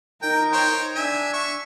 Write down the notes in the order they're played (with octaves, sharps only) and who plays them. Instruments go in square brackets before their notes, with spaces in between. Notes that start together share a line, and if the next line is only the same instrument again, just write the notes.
[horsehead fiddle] D#4 A#4 [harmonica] G5
[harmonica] C5 C#5 G5
[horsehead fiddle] D4 [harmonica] E5 G#5
[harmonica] E5 C#6